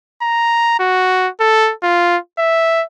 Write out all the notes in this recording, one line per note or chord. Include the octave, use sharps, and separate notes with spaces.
A#5
F#4
A4
F4
E5